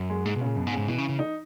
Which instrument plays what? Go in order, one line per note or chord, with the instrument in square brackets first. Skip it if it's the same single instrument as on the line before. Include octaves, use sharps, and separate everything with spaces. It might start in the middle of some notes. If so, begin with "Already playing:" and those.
Already playing: [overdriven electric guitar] F#2
[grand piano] G#3
[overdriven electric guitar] G#2 [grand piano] G#3
[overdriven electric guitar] B2
[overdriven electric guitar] A#2 [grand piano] C#3
[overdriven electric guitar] F#2 [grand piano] B2
[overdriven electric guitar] G#2
[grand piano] C#3
[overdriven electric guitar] G#2
[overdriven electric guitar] B2 [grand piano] E3
[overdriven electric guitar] C#3
C#3
[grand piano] D#4